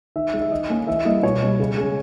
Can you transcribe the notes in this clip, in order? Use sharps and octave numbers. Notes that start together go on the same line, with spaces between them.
D#3 E5
G#3 D#4
E5
D#3 D#5
A#3 C#4
E3 E5
G3 A#3 E4 D#5
B2 C#5
G3 B3
C#3
G#3 C#4